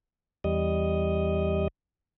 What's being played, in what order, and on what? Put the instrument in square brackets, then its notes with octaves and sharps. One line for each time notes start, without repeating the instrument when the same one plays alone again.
[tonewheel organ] E2 G3 D#5